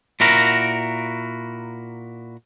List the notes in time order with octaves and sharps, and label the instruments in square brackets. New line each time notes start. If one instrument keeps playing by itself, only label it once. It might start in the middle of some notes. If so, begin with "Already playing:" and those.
[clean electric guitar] A#2 E4 F#4 A#4